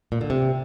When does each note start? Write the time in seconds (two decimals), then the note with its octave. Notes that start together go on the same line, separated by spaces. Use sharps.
0.12 A#2
0.21 D3
0.30 C3